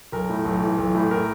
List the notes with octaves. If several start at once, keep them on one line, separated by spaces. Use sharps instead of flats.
B1 A#4
A2
B1
E3
B1
A2
A#4